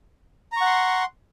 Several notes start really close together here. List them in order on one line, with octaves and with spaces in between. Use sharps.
A#5 C#6 F#5 C6